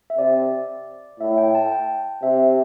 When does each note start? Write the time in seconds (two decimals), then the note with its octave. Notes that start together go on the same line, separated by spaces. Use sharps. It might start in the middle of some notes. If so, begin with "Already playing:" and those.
0.10 E5
0.18 C3 D5
1.20 A2 E5
1.38 G5
1.55 A5
1.72 G5
2.23 C3 E5